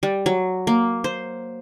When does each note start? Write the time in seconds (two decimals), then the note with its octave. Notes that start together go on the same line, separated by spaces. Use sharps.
0.03 G3
0.26 F#3
0.67 A#3
1.04 C5